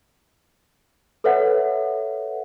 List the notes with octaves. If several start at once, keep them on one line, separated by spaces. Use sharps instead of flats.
A4 B4 C#5 E5 F#5